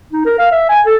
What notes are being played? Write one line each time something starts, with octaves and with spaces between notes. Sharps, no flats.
D#4
A#4
F5
E5
G#5
A4